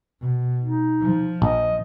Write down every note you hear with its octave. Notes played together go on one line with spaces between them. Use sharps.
B2
D#4
F3
A#1 D#5